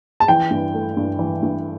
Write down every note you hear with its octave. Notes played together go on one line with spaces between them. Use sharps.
A5
E3 G5
G2
A3
G2
E3
G2